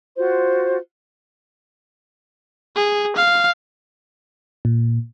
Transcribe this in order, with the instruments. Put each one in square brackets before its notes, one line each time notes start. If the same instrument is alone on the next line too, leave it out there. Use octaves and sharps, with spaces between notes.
[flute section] F4 F#4 C5
[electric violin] G#4
F5
[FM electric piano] A#2